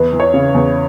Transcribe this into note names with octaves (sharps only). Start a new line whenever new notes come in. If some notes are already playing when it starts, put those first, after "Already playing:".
Already playing: E2 B4
E3
C#5
C#3
E2